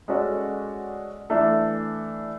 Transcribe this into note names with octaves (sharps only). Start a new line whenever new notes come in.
G#3 C#4 F#4 A4 D5
E3 A3 D4 A4